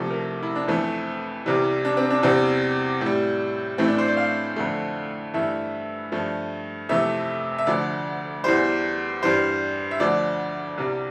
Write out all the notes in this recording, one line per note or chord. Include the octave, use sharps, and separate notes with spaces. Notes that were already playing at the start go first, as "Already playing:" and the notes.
Already playing: C2 C3 F3 A3 E5
A#4
E4
D4
F2 E3 A3 C4
C2 C3 E3 G3
D4
C4
D4
E2 C3 G3 C4
A2 G3
A2 E3 A3 C4
D4
C5
D5
F5
F2 D3 A3
G2 E3 A3 E5
G2 F3 A3
F2 C3 E3 A3 E5
E5
D2 D3 F3 D5
E2 E3 G3 C5
G2 E3 G3 C5
E5
D2 D3 F3 D5
C2 C3 G3